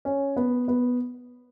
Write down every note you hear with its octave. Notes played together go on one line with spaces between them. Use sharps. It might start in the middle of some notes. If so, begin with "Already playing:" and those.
C#4
B3
B3